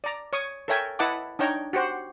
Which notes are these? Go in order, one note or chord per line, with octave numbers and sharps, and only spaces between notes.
D5 A#5
C#5 C#6 D#6
A4 A#4 C#5 E5 G5 G#5
E4 B4 D#5 F#5 A5 D6
D4 D#4 C#5 G5 A#5
F#4 G4 C5 F#5